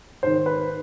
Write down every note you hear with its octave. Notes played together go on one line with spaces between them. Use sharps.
G#2 D#3 C5
B4